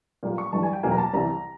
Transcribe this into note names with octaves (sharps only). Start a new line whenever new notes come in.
A#2 G3 A#3
C#6
G2 E3 G3 A5
G#5
G5
E2 B2 F#3 A#3 G#5
A#5
A5
C2 C3 E3 A#5